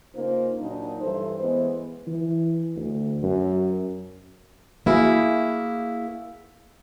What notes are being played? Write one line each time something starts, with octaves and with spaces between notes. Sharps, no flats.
C#3 A#3 D#4 F4 C5
A#2 F#3 D4 D#4
G2 E3 A4 C5
E3 G#3 B3 C5
E3
D2
F#2
A#3 E4 F#4 G#4